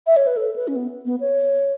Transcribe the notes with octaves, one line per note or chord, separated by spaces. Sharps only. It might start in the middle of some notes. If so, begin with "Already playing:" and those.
E5
C#5
B4
A4
B4
C#4
B3
B3
C#5